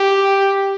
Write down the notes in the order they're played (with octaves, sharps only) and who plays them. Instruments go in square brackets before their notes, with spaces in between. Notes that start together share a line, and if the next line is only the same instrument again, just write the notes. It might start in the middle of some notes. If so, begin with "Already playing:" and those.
Already playing: [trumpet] G4